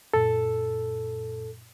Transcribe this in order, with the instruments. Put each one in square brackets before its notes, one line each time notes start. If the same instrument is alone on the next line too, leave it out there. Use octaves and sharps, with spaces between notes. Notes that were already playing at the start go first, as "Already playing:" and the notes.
[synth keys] F#2 A#2 [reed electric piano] A4